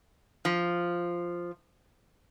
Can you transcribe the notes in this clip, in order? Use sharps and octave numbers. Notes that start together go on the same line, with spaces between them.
F3